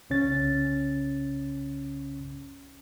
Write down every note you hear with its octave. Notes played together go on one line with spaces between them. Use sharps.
C2 C#3 C#4 A6